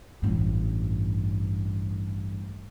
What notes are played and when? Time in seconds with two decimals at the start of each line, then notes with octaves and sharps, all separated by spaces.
0.22 A1 G2